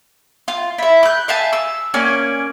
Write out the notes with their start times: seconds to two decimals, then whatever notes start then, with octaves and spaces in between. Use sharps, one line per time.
0.48 F4
0.78 E4 E5
1.03 F#6 G6
1.28 E5 F5 G#5 A5
1.53 E6
1.94 A#3 C#4 D5 G#5